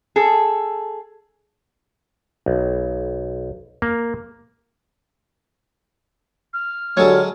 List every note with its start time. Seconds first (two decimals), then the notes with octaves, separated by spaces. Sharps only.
0.16 G#4 A4
2.46 B1
3.82 A#3
6.53 F6
6.97 D3 F#3 G#3 F#4 G4 A4 C#5